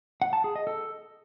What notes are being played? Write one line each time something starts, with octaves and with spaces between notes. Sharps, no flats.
F#5
A5
G#4
D#5
A4